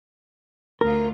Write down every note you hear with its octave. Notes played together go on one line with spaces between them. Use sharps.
D2 F4 A#4